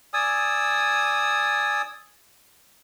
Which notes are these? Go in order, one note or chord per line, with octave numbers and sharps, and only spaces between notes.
D5 G#5 D#6 E6